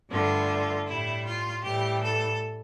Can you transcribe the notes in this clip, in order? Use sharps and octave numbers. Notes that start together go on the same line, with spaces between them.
G2 D3 A3 F4
A2 G3 E4
F4
A2 E3 G3 G4
A4